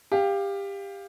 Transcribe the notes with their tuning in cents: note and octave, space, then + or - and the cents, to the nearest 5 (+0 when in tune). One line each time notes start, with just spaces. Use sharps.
G4 +20 F5 +0